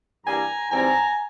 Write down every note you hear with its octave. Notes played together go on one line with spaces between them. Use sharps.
G2 E3 G3 A#3 G#5 A#5
G#2 E3 G3 C4 G#5 A#5